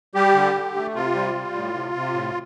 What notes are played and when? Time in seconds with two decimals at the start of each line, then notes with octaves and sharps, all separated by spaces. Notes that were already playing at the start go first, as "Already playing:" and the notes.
0.15 G3 G4
0.35 D3
0.55 D3
0.75 A3
0.95 C3 F4
1.15 G3
1.35 G3
1.55 A2
1.74 C3
1.95 C3
2.14 A2